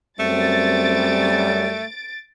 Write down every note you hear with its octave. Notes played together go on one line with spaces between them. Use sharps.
F#2 G3 A3 C4 A6 D7